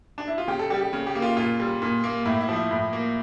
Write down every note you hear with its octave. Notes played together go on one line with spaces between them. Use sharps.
D4
E4
F4
C#3 G4
A4
G3 G4
G4
C#3
G4
A#3
F4
A#2 F4
G3
A#2
A#3
A2 E4
E4
F3
E4
A2
A#3